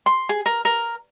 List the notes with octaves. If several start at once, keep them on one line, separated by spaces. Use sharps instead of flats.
C6
G#4
A#4
A#4